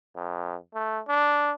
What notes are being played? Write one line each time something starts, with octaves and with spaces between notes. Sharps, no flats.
F2
A3
D4